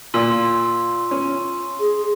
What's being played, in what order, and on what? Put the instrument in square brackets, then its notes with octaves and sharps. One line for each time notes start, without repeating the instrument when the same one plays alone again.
[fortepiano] A#2 [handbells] F4 E6 [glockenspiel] C6
[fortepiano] C#4
[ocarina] G#4